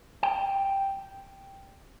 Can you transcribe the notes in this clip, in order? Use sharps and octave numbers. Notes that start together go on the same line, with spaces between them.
G5